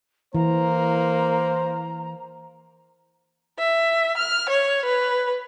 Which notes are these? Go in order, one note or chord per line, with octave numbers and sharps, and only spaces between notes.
E3 A#3 C5 A#5
E5
F6
C#5
B4